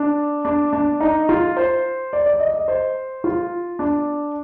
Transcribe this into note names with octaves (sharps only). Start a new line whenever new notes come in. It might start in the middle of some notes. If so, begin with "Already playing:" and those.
Already playing: D4
D4
D4
D#4
F4
C5
D5
D5
D#5
D#5
C5
F4
D4